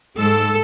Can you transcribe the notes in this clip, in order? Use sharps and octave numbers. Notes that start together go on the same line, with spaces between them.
G#2 G#3 A4